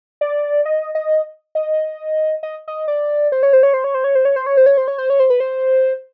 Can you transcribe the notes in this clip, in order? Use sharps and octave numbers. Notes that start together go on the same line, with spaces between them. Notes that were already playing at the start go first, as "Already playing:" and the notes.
D5
D#5
D#5
D#5
D#5
D#5
D5
C5
C#5
C5
C#5
C5
C#5
C5
C#5
C5
C#5
C5
C#5
C5
C#5
C5
C#5
C5
C#5
C5
B4
C5